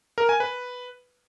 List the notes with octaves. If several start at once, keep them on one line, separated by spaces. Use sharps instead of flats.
A#4
G#5
B4